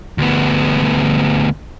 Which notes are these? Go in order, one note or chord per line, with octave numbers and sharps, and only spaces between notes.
D2 B3